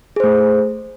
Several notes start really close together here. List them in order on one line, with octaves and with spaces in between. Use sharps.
G#4 C5 A3